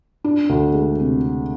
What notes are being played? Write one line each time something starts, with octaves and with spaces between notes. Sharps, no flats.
D4
D2
G#3
C3